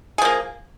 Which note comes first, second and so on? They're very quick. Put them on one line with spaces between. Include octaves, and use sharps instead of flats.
G#4 F3 A#3